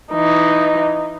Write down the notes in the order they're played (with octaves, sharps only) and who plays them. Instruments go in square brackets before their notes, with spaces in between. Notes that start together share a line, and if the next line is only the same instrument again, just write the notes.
[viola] E3 D#4